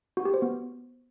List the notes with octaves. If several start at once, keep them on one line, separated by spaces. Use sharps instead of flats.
F#4
G4
C5
B3